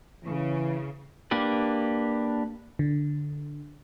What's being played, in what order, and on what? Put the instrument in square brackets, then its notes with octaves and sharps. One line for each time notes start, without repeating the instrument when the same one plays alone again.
[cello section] C#3 [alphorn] E3
[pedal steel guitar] A#3 D4 G4 B4
[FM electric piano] D3